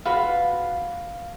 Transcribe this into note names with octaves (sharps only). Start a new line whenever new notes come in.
F4 F#4 B4 F5